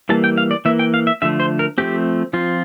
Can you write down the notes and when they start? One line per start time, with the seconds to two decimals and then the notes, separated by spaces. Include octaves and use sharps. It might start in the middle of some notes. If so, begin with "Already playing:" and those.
0.09 E3 G3 A#3 A5
0.24 G5
0.38 F5
0.51 D5
0.65 E3 A#3 E5
0.79 G5
0.94 F5
1.07 E5
1.22 D3 F3 A3 E5
1.40 C5
1.59 A#4
1.78 F3 A3 C4 G4
2.33 F3 C4 F4